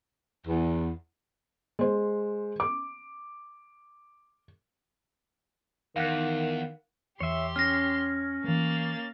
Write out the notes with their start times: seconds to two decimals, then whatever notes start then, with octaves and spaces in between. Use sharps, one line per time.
0.46 E2
1.79 G#3 C5
2.60 D6
5.96 E2 D#3 A#4 F5 F#5 F#6
7.20 E2 G4 C#5 E5 C6
7.56 C#4 F6 A#6
8.44 E3 A3 A#3 A6